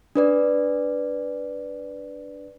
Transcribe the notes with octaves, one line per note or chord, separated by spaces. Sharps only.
D4 B4 D5